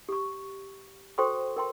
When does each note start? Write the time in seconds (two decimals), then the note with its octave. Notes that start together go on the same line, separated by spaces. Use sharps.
0.09 G4 C#6
1.18 F#4 A4 C5 G5 C6 C#6
1.56 A#4 G5 C6